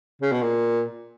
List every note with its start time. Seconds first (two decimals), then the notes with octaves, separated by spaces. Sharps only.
0.22 C#3
0.32 B2
0.42 A#2